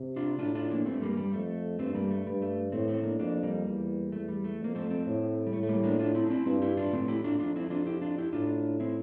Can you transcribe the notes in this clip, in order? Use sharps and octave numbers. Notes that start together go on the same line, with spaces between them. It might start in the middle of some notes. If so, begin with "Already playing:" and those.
Already playing: C3
D4 F4
A2 D4 F4
D4 F4
A#3 D4
G2 A3 C4
G3 A#3
G3
F2 A3
G2 A3 C4
G3 A#3
A3
G2 G3
A3
A2 A3 C4
A3 C4
A#3 D4
F2 A#3 D4
G3 A#3
E2
E2 A3
G3
A3
F2 A#3
A3 C4
A3 C4
A2
G3
A2 A3
A3
G3 A#3
A#3 D4
D4 F4
C4 E4
D4
C4 E4
G2 C4 E4
E4 G4
D4 F4
A2 A3 C4
E4 G4
D4 F4
F2 D4 F4
C4 E4
D4 F4
E4 G4
D4 F4
E4 G4
A2 D4 F4
C4 E4